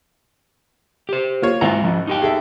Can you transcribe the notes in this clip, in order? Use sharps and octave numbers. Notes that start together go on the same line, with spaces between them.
G4 C5
A#3 F4 C#5
G#1 E3 G#3 F4 F#5 A#5
F3 C#4
D#4 G4 G5
G#4 A4 E5